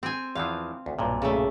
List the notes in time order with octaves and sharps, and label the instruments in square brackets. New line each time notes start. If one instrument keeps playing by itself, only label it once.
[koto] C4 G#5
[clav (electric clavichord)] E2 E3 F3 [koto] F5
[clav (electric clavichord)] D2
B1 G2 A#2
[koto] C#3 A3